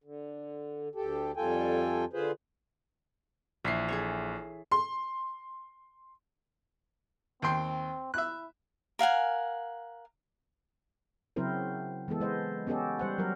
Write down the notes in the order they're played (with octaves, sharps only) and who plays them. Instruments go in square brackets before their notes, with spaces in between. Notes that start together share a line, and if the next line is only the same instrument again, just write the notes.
[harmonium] D3
D2 G4 A4
F2 G3 F4 A4 G5 G#5
D3 F4 G#4 B4 C5
[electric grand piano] A#1 B6 C7 [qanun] E3 C#5
[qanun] G#4 A4 C#5
[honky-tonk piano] C6
[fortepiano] D#2 G5 C6 [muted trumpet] C4
[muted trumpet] E4 [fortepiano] E5 F#6
[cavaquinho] A#4 F5 F#5 G#5
[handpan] C#3 F#3 C4 E4 A#4 C5
E3 G#3 B3 A4
G#3 C5 D#5
B3 C#4 G4 A4 D#5
G3 C5 F#5
F#3 G3 A#4